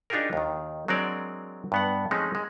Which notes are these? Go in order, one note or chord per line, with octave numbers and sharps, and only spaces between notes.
D4 D#4 F4 G4 G#4 A#4
D#2 D#3
F#3 G#3 C4 D4 A#4 D5
G2 B3 F#5
F3 G#3 A3 C4 C#4 D#4
G#3